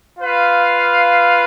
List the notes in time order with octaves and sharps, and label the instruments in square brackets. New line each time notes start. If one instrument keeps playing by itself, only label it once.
[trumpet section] F4 B4 F5